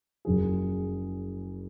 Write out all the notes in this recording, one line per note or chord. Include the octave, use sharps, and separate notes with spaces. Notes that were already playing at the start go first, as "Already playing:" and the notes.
F#1 F#2 F3 G#4